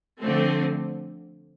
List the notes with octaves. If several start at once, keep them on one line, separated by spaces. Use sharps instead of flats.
D3 F3 A3 C4